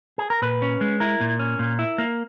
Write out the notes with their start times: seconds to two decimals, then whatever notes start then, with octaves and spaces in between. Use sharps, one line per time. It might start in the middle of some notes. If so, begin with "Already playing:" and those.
0.18 G#4
0.30 A#4
0.42 A#2 B4
0.62 C#4
0.81 G#3
1.00 E4 A#4
1.21 A#2
1.39 C#4
1.59 A#2
1.79 E4
1.98 A#3